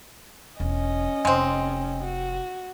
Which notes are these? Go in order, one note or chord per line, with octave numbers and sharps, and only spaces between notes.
E1 C#4 D#5
F1 G#3 C4
F#4